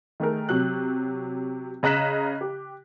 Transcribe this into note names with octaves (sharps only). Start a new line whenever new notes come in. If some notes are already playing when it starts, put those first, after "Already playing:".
D#3 A3 G#4 A#4
C3 F#3 F#6
C#3 D#5 A#5 F#6 B6 E7
G4